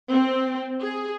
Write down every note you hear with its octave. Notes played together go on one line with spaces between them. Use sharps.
C4
G#4